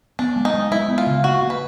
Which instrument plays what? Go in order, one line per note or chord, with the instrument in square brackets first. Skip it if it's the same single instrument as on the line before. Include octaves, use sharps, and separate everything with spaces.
[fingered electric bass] B3 [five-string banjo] D4
[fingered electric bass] G#3
[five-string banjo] D#4
[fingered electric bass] G#3
[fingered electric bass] G#3 [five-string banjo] E4
[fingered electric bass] B3
[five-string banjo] F4
[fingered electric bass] C#3
[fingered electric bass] A#3 [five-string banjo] F#4
[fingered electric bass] A#3
[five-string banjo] B4